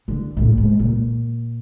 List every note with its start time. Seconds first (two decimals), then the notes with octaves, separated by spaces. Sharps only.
0.08 D3
0.37 A#1 A2
0.58 G#2
0.79 A#2